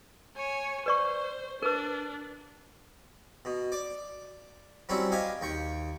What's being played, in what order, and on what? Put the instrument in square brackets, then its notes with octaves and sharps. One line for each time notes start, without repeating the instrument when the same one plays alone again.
[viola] C#5 G#5
[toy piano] B4 D5 C#6 [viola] C5
[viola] D4 [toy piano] A#4 B4
[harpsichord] B2
D5 D6
F#3 G3 C4 C#4 E4
G4 D#5 F5 G#5
D#2 G5 C#6